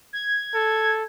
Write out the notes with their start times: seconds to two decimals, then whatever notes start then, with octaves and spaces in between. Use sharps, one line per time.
0.13 G#6
0.55 A4